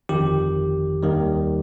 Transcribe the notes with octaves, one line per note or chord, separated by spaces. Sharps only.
G1 F2 D#3 G4
D#2 D#3 G3